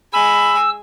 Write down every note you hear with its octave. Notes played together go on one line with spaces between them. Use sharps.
G#3 G#5 B5 E6